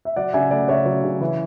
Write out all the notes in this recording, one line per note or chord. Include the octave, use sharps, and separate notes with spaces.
E5
F#3 D5 F#5
C#3 E5 G#5
A3 D5 F#5
C#3 C#5 E5
F#3
C#3
E3